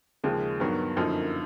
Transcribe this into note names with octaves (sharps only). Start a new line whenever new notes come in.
D#2 C#3 F3 G#3
G2 D#3 F#3 B3
F#2 D3 F3 A#3 D#4